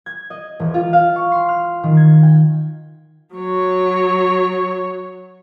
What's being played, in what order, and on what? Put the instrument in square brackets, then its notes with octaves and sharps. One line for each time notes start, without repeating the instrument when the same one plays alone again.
[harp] G#6
D#5
E1
F4
F5
C#6
C6
F6
D#3
G#6
G5
[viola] F#3 C#5